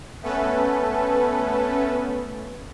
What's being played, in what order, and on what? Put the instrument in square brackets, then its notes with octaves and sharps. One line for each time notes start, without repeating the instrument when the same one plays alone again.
[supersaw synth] A3 B3 C#4 A4 B4